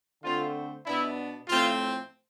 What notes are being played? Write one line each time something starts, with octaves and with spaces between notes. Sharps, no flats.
D3 A3 C4 F4
B2 B3 D4 E4
A2 F3 A3 C4 F4